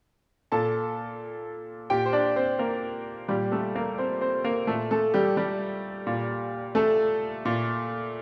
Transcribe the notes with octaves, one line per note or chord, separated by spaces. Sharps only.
A#2 A4 A5
A#2 G4 G5
C5
D4 D5
C4 C5
A#3 A#4
A#2 G3 G4
A3 A4
A#3 A#4
C4 C5
C4 C5
A#3 A#4
A#2 A3 A4
A3 A4
G3 G4
G3 G4
A#2
A3 A4
A#2